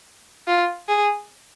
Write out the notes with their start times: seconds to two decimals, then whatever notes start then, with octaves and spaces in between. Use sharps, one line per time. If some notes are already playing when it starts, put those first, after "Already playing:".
0.47 F4
0.88 G#4